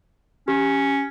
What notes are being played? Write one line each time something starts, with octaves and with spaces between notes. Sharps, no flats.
C#4 G4